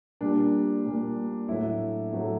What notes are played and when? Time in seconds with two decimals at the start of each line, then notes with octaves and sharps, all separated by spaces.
0.21 A#2 G3 A#3 D4
0.84 A#2 G3 A#3
1.48 A2 F#3 A3 E4
2.12 A2 F#3 A3